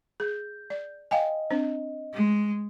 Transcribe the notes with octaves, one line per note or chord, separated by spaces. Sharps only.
G#4 G6
D5
D#5 F5 G5 G#5
C4 D4 C5
G#3